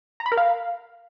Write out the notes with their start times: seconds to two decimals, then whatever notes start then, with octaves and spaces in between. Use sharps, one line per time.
0.20 A#5
0.26 B5
0.32 A#4
0.37 F5